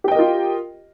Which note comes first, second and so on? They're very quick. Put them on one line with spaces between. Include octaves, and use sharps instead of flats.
G4 G5 D#5 A#4 F4